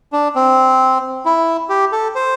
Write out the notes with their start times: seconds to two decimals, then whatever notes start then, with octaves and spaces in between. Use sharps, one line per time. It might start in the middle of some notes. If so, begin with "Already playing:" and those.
0.13 D4
0.35 C4
1.25 E4
1.69 G4
1.92 A4
2.15 C5